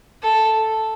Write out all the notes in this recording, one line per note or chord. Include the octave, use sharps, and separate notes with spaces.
A4